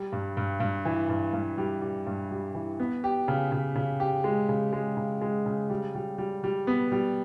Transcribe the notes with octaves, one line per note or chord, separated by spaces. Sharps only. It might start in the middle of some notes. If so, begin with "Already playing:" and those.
Already playing: G3
G2
G2
G2
E3
G2
G2
G3
G3
G2
G3
E3
B3
G4
C#3
C#3
C#3
G4
G#3
C#3
G#3
C#3
G#3
C#3
G3
G3
G3
G3
B3
G3